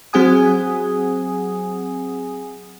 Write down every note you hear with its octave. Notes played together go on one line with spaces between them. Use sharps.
F#3 C4 G#4 F#5 G#5 D#6